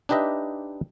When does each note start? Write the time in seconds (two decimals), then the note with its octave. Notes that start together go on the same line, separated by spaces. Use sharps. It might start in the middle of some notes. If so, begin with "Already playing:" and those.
0.09 D4 D#4 G4 B4 D#5 E5